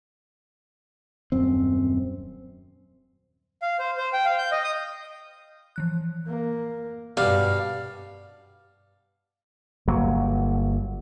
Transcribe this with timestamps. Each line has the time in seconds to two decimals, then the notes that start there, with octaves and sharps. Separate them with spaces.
1.32 D#1 F#2 C4
3.62 F5
3.79 C5
3.97 C5
4.13 G5
4.25 F5
4.38 G6
4.52 D#5
4.64 D#6
5.76 E3 F3 F#6
6.27 A#3
7.17 G2 B2 G3 F5
9.87 G1 F#3 A#3